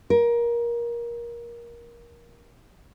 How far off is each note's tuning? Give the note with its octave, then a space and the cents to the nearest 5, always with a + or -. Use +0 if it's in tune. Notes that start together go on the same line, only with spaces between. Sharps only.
A#4 +20